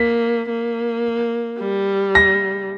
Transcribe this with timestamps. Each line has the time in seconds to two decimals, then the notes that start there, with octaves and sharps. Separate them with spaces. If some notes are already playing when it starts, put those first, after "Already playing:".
Already playing: A#3 B6
0.49 A#3
1.59 G3
2.15 A#6